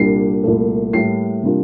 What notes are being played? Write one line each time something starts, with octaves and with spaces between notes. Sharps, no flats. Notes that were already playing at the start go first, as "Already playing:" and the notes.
Already playing: C2 A#2 G3 D4 C7
C2 A#2 A3
A2 G3 A#3 E4 C7
C3 G3 A#3 D4 F4